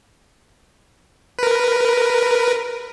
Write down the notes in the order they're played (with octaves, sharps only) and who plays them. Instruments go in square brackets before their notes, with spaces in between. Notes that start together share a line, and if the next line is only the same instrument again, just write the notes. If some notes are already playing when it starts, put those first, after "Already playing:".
[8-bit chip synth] A#4 B4